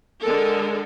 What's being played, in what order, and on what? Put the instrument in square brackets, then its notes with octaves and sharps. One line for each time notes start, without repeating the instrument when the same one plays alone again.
[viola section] D3 G#3 A4 A#4